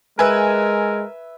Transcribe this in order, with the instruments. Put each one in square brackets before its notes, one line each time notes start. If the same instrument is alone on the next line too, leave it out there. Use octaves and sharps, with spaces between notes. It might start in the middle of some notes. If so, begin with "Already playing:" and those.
[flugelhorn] G#3 [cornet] A#4 [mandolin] B4 E5 [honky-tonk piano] G#5